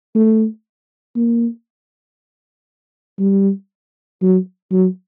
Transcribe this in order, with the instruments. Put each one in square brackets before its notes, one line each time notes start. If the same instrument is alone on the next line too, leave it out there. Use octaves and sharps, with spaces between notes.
[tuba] A3
A#3
G3
F#3
F#3